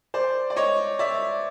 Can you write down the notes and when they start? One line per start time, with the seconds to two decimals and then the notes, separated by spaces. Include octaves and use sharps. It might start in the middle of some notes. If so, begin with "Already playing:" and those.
0.14 C5 D5
0.50 D5
0.56 C#5 D#5
0.99 D5 E5